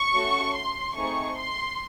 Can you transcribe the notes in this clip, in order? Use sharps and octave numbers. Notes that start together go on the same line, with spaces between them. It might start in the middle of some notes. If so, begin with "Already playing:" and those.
Already playing: C#6
A3 C#4 F#4 A4
C6
A3 C4 D#4 G#4 C#6
C6